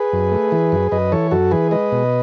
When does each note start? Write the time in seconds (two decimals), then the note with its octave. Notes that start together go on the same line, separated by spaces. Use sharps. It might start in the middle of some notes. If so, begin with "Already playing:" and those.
Already playing: G#4 B4
0.13 F#2
0.32 A3
0.52 E3
0.72 F#2
0.91 F#2 B4 D#5
1.12 E3 A4 C#5
1.31 F#2 F#4 A4
1.51 E3 G#4 B4
1.71 G#3 B4 D#5
1.92 B2